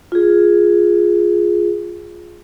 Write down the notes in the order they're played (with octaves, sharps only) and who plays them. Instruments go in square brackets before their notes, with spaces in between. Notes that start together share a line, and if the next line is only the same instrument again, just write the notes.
[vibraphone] F4 G#4